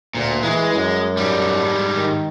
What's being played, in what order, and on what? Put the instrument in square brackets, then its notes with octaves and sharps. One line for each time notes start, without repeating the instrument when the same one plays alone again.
[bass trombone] D2 [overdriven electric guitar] A#2
[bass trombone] E3 [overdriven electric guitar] G#3
[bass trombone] F#2
[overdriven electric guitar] G#2 G3
[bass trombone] D#3